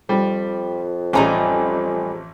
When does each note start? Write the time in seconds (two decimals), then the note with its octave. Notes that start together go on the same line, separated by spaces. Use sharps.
0.09 F2 G3
1.13 A1 G3 D#4 G#5 A#5